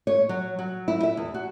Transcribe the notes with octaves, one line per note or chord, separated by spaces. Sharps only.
C#5
F#3
F#3
E4
E5
E2
F#4